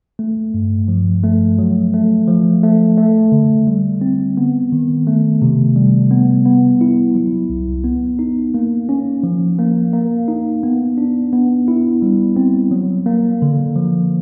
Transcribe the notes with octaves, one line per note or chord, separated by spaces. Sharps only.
A3
G2
F3
A3
F#3
A3
F3
A3
A3
D3
G3
C4
B3
D#3
A3
C3
G3
B3
B3
E4
F#3
C2
B3
D#4
A#3
C#4
F3
A#3
A#3
D#4
B3
D4
B3
E4
G3
C4
F#3
A#3
D3
F3